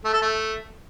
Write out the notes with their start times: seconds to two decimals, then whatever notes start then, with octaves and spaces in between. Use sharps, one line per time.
0.05 A3
0.13 A4
0.22 A3